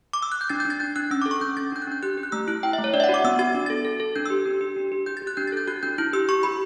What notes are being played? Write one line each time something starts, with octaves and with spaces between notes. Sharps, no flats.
D6
E6
F#6
G6
D4 A6
G6
D4
A6
D4 G6
D4 F#6
C#4 E6
A4 D6
C#6
C#4 G6
C#4 A6
D4 G6
F#6
D4 G6
G4 F#6
G4
F#6
A3 E6
E4 F#6
E4 G5
E5
A3
C#5
D4 D5
E5
F#5
F#4
D6
B3 E6
F#4 A6
D4
A4 A6
A4
A4
D4 G6
E6
G4
D4
G4
D4
G4
G4 G6
A6
G4
F#6
D4 G6
A6
A4 G6
F#4 F#6
D4 G6
E4 G6
G4 E6
G4 C#6
G4 B5